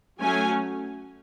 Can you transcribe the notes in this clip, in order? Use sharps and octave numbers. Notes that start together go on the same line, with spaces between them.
F#3 A3 C#4 G#5